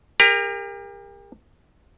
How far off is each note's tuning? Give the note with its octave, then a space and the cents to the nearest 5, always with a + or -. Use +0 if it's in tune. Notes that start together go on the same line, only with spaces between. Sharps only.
G4 +40 A#4 +0